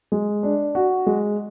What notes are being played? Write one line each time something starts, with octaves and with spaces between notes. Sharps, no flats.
G#3
D4
F#4
G#3